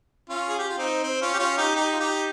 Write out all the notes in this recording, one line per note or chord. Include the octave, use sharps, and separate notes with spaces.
C#4 F4
G#4
G4
F4
C4 D#4
C4
C#4 F4
G4
C#4 F4
D#4 G4
D#4 G4
F4
D#4 G4